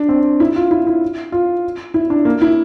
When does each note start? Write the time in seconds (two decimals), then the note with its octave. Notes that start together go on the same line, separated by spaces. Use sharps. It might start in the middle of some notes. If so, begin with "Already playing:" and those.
Already playing: D4
0.09 C4
0.40 E4
0.56 F4
0.71 E4
0.87 E4
1.32 F4
1.94 E4
2.10 D4
2.25 A#3
2.42 E4